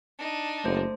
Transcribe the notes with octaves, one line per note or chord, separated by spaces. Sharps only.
D4 D#4
F#1 A3 C5